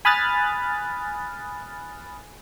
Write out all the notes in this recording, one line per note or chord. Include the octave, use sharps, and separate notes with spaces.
G#5 B5 D#6 F6 F#6 A6